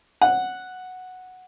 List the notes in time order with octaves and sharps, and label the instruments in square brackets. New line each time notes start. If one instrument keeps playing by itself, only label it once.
[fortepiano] F#5